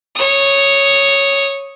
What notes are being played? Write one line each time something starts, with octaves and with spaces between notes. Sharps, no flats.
C#5 D#6